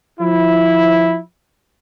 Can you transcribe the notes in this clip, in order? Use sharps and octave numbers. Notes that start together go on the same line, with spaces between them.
F3 E4